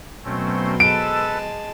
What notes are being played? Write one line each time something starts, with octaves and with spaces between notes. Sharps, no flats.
B2 F#3 A3 C4 C#4 C5
G#3 A4 B4 A5 E6 D7